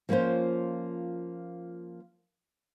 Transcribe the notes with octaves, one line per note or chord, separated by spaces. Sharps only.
F3 A#3 C#4 F4 C5